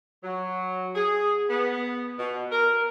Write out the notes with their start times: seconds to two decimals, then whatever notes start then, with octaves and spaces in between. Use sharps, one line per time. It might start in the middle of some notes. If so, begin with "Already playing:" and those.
0.24 F#3
0.95 G#4
1.50 B3
2.19 B2
2.52 A#4